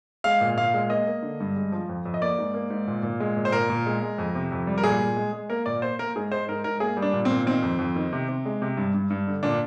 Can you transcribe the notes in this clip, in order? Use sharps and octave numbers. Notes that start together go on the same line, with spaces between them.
G#3 F5
A#2
A#2 F5
G#3
A#3 D#5
A#3
D3
G2
G#3
F3
F2
F2
D#5
A#3 D5
G#2
A#3
G#2
A#2
A#2
G#3
A#2
C5
A#2 A#4
A#2
G#3
G#3
F2
C3
F2
G3
A#4
A#2 G#4
A#2
G#3
G#3
A#3 A#4
A#2 D5
A#3 C5
A#3 A#4
G#2 G#4
G#3 C5
G#2 A#4
G#2 A#4
A#3 G#4
G3
D4
A#2
C4
A#2
D#3 C4
F2
F2
D#3
C3
C3
G#3
C3
G2
G2
G2
D3
A#2 D4